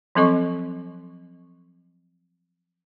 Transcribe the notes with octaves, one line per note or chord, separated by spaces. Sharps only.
F3 F#3 C4 A4 D#5 C#6